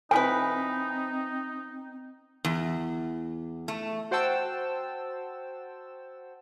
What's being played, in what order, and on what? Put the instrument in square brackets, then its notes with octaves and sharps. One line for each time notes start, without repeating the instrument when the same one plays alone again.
[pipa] F3 E4 B4 [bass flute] C4 [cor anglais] D#4 [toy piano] G#5
[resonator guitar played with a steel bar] E2
A3
[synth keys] F#4 C5 F#5 G5 A5 E6